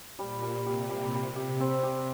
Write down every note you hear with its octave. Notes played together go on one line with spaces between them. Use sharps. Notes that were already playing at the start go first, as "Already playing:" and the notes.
A#2 G3
G3
C3 G4
G3
G3
G4
C3 C4
G4